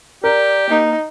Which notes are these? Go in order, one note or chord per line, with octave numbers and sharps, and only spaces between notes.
G4 A#4 D5
A#3 D#4